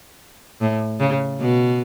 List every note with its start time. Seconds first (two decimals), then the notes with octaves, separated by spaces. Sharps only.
0.61 A2
1.00 C#3
1.40 B2